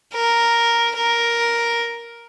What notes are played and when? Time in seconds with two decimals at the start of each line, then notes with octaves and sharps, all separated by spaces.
0.14 A#4
0.96 A#4